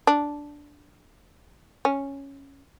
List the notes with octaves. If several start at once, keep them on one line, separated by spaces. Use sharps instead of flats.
D4
C#4